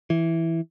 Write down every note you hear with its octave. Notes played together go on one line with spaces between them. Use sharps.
E3